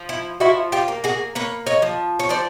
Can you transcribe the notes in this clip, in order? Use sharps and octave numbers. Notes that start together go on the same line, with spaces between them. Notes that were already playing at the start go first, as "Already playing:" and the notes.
Already playing: F3
E4
F3 E4 F#4
F4 G4
A#3
F#4 G#4
A#3 B4 C#5
C#5 D#5
F3
C#5
F3 C5 D5